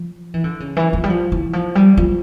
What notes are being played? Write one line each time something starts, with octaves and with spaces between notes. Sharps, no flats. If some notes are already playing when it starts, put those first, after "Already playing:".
Already playing: F3
E3
D3
C#3
E3
F3
G3
F3
E3
F3
G3
F3